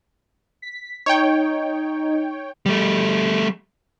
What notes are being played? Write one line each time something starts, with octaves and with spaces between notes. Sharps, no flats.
B6
D#4 C#5 G5
G3 A3